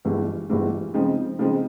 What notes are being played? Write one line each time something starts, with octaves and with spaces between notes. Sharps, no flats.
G1 G2 E3 G#3
G1 G2 E3 G#3
C#3 F3 G#3 C4 D#4
C#3 F3 G#3 C4 D#4